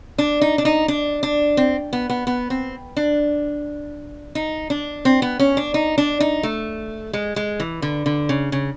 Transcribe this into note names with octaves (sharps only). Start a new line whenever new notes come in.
D4
D#4
D4
D#4
D4
D4
C4
B3
B3
B3
C4
D4
D#4
D4
C4
B3
C#4
D4
D#4
D4
D#4
A3
G#3
G#3
E3
D3
D3
C#3
C#3